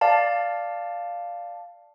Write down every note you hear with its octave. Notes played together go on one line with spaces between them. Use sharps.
D5 F5 A5